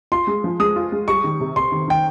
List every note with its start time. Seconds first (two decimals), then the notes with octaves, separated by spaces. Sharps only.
0.12 F4 C6
0.27 G#3
0.44 F3
0.59 G#3 D#6
0.76 F4
0.92 G#3
1.08 G3 C#6
1.24 D#3
1.40 C3
1.56 C3 C6
1.72 D#3
1.88 D#3 G5